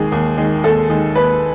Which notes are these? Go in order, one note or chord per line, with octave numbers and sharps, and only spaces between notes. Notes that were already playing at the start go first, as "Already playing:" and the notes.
Already playing: D#2 D#3 G#3 G#4
D#2
D#3 G#3
D#2 A4
D#3 G#3
D#2 B4